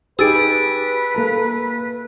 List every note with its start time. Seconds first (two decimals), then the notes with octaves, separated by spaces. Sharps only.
0.19 D#4 G4 G#4 B4 E6 A6 D7
1.15 A#3 A4 A#5